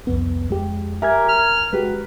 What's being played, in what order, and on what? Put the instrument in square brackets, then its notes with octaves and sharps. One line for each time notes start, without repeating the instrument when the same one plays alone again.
[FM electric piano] C2 F2 B3
F2 G#3 G4
[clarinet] G4 [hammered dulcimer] A#4 [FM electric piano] E5 G#5 G#6
[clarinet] F6
[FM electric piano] G#3 F#4 G4 [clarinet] B4